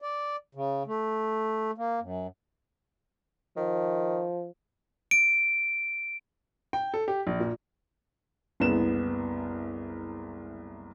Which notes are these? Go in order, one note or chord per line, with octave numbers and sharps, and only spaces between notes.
D5
C#3
A3
A#3
F#2
D#3 F3
D7
G5
A4
G4
A#1
A#2
F#1 C2 B3 E7